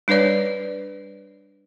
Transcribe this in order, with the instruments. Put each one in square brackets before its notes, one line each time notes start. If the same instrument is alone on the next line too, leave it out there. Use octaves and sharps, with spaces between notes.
[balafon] G3 D4 B4 C#5 D5